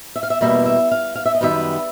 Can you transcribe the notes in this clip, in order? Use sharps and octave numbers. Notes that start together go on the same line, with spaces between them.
E5
F5
E5
E2 B2 G3 A#3 E5
E5
F5
F5
E5
D#5
F#2 D#3 G3 B3 E5